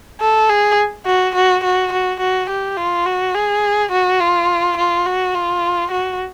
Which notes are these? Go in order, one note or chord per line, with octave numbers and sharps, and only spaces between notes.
A4
G#4
F#4
F#4
F#4
F#4
F#4
G4
F4
F#4
G#4
F#4
F4
F4
F#4
F4
F#4